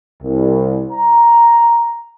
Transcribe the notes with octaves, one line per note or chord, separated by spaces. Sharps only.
C2
A#5